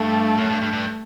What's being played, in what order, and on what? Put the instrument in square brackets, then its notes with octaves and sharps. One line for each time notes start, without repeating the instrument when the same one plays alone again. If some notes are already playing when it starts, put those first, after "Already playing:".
Already playing: [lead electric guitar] G2 [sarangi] A3
[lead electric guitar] F#2
G2
G2
G2